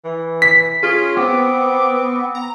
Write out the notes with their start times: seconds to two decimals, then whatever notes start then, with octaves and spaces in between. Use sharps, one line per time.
0.04 E3
0.42 B6
0.83 C#4 F4 G#4
1.17 B3 C4 D6
2.35 A#5